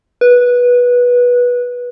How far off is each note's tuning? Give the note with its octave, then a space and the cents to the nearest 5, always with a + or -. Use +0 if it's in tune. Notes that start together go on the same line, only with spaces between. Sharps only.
B4 -15